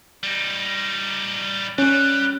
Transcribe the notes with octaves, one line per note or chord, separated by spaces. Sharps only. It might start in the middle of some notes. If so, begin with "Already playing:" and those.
G3 D#4
G3 C#4 F#6